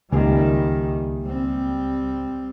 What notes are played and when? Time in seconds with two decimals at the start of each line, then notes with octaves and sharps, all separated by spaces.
0.12 C#2 D#3 G3 A#3 G4 G#5
1.24 G3 C4